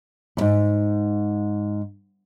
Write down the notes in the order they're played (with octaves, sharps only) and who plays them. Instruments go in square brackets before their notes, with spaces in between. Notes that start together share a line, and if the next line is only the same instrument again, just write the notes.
[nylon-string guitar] E2 G#2